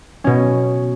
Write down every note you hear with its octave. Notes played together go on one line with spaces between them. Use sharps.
B2 C#4